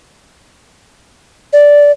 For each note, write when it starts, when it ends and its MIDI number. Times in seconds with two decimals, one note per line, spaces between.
1.53 1.92 74